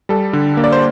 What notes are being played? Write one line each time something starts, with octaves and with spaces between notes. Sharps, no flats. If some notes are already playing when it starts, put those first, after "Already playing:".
G3 A4
D3
A#3
D5
C5